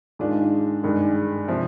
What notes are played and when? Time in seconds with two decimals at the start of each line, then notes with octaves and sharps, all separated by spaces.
0.19 G#2 D#3 G#3 D4 F4
0.83 G2 D#3 G#3
1.48 C3 F3